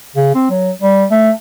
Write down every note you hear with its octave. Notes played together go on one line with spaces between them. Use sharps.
C#3
C4
F#3
G3
A3